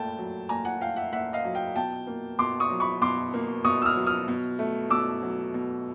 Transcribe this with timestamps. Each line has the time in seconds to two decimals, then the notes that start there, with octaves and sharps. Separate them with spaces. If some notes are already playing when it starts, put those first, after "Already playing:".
Already playing: A#2 A3 G5 A5
0.18 F#3
0.49 A#2 G#5 A#5
0.65 F#5 G#5
0.81 A3 F5 G5
0.96 E5 F#5
1.12 A#2 E5 F#5
1.33 D#5 F5
1.45 F#3
1.55 F5 G5
1.76 B2 G5 A5
2.07 A#3
2.39 B2 C6 D6
2.60 C#6 D#6
2.70 F#3
2.80 B5 C#6
3.02 B2 C6 D6
3.34 A#3
3.64 B2 C#6 D#6
3.82 E6
3.86 D#6 F6
3.97 F#3
4.07 D#6 F6
4.28 B2
4.59 A3
4.90 B2 D6 E6
5.23 F#3
5.54 B2